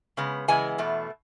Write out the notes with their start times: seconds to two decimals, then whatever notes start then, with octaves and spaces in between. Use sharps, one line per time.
0.17 C#3 G#3 B3
0.48 C#3 E3 G#3 B3 G#5
0.78 E2 B2 A3